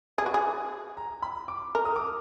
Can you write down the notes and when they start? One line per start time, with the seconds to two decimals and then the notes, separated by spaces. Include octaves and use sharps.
0.18 G#4 G#5
0.26 F#4
0.34 G#4
0.97 A#5
1.22 B5
1.48 D6
1.75 A#4
1.85 D#6
1.96 D6